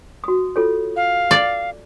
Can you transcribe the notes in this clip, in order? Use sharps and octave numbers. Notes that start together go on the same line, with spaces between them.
F#4 D#6
F4 A4 C#5
F5
D5